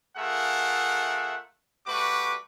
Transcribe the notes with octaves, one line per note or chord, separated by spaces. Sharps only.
A3 F4 G#4 A#4 E5 F#5
G3 A3 F#4 B4 C#6 D6